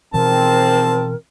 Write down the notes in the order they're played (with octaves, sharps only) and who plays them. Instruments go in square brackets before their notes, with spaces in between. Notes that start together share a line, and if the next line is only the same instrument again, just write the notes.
[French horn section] G#2 F3 C4 [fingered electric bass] B2 E3 [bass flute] A#4 [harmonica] A5